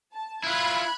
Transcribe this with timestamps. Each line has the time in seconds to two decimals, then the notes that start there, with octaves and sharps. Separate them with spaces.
0.14 A5
0.44 E4 F4 B5 F#6 G#6